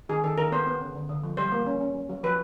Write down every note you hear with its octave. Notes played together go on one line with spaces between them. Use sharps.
D#3 G#4
D#3 A4
D#3 A#4
B3 C5
B3
C#3
D3
D3
F3
G3 C5
A#3
C#4
C#4
F#3
F#3
F3 B4